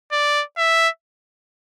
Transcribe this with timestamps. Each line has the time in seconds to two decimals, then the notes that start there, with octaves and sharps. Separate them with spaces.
0.12 D5
0.57 E5